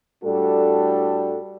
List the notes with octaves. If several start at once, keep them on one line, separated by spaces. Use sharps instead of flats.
A2 G3 D4 F#4 A4